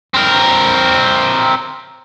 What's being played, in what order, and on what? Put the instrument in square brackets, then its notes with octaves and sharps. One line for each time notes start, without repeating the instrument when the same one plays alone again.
[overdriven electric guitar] C4 A#4